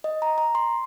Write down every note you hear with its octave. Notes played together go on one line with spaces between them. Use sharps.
D#5
A#5
A#5
C6